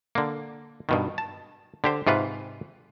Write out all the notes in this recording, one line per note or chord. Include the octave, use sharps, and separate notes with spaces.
D3 A#3
G2 B2 D#3
A5
D3 G4 C5
G#2 C3 F4 B4